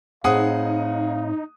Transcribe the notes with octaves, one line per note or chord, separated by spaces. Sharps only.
A2 C4 D#4 G#4 F5 F#5 D#6